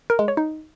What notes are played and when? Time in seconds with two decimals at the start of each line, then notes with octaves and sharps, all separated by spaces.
0.10 A#4
0.19 G#3
0.28 C#5
0.37 D#4